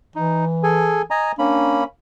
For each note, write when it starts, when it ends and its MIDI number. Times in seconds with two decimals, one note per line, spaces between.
0.16 1.07 52
0.16 0.45 63
0.63 1.02 68
0.63 1.02 69
0.63 1.02 80
1.10 1.32 75
1.10 1.32 80
1.10 1.32 82
1.39 1.84 58
1.39 1.84 61
1.39 1.80 62
1.39 1.84 83